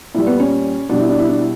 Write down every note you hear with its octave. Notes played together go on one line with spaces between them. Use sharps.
A#2 G3 E4
B3
C#4
B2 G3 D4
E4
D4
E4
D4
E4